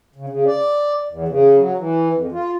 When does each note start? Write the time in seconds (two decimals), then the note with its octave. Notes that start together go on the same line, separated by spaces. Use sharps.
0.16 C#3
0.29 C#3
0.46 D5
1.09 E2
1.28 C#3
1.57 F#3
1.77 E3
2.14 F2
2.32 F4